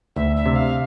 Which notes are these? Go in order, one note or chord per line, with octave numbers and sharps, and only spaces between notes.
D2 E5
E5
C3
F5